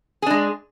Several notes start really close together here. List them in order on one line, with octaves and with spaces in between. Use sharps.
G#4 D4 G#3